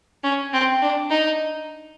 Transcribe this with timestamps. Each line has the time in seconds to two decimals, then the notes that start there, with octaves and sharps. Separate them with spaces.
0.24 C#4
0.53 C4
0.82 D4
1.11 D#4